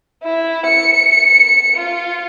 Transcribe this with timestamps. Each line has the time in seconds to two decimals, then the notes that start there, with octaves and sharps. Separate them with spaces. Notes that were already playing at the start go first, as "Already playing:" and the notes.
0.23 E4
0.66 C#7
1.76 F4